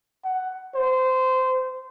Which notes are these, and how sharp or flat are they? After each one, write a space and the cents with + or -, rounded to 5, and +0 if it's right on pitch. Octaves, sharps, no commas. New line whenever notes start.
F#5 +10
C5 -20